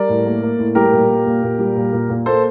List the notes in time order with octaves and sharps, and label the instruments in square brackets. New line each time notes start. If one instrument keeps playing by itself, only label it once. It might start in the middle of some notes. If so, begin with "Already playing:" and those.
Already playing: [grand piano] G3 A#4 D5
A2
A#3
A#3
A2
G3 G4 A#4
A#2
A#3
A#2
A#2
G3
A#2
A#2
A#2
A#3 A4 C5